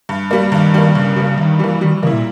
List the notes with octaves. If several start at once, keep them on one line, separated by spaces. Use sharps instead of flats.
G2
G3 A#3
G2 D#3
G3 A#3
G2 C#3
C#3 G3 A#3
G2 D#3
E3 G3 A#3
D#3 G3
E3
C#3 A#3 E4
A#2